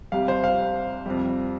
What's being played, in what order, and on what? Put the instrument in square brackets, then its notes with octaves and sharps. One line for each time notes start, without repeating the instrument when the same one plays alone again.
[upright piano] C2 C3 G3 F5
C5
F5
F2 C3 G3